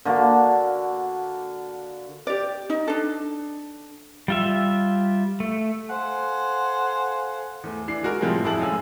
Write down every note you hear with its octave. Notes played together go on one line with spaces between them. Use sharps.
D3 A#3 F#4
G4 D5
D#4
D4 A4
G3 F4 E5
A3
A4 C5 F5 F#5 G#5
E2 A3
E3 D4 C7
G#3 F#4 A#4
A2 C3 F3 G3 G#3 C4
F1 F2 E4 G#4 A5 F#7
F#2 G#3 A3 F5 G#5 E6